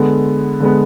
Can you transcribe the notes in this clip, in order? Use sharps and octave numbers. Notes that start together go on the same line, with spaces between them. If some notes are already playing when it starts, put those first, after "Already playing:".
Already playing: D3 G#3 B3
D3 G#3 B3